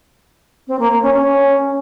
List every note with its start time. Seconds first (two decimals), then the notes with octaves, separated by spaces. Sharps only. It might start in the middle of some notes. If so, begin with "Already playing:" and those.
0.67 C4
0.79 A#3
0.90 A#3
1.01 C#4
1.13 C#4